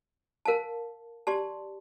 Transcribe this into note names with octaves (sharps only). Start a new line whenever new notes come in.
A#4 F5 A5
G4 D5 A5 C6